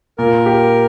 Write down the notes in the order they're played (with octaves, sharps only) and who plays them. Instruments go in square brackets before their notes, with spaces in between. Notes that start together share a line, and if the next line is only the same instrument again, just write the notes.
[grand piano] A#2 [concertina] A#4
[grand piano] G4